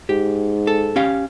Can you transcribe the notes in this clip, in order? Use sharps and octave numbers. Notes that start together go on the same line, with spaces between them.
G#2 G4
A4
C#4 G4 F5